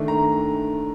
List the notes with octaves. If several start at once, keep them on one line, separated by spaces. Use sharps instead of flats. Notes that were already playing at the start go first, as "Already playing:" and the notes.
Already playing: D#3 A3 D4
A#5